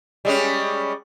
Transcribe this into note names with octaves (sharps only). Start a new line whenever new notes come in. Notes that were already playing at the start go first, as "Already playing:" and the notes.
G3 G#3 C#4